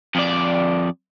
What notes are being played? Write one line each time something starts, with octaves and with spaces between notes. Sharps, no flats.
F2 D5